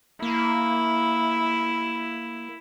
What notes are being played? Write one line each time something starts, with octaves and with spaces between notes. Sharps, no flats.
A#3 E4